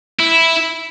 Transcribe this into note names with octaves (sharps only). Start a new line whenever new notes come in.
E4